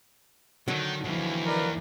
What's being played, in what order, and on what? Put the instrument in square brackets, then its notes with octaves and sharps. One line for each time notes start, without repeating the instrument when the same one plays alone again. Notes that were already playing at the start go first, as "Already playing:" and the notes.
[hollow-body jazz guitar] D3 F#3 [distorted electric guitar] D#3
[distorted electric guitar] D#2 [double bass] E3 F3
[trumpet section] A#4 B4 D5